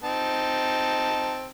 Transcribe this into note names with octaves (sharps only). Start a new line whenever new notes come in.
C4 D#4 A5